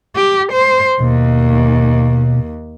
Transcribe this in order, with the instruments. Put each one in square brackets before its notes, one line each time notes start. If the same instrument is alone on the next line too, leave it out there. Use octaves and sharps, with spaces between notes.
[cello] G4
C5
[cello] D#2 [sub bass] B2